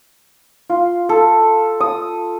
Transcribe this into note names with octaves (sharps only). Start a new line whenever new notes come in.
F4
A4
D#6